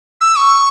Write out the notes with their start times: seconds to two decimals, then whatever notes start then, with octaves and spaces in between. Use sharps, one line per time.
0.21 E6
0.37 C#6